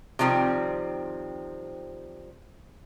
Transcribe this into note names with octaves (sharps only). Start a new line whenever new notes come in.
C3 D#3 F3 G3 C4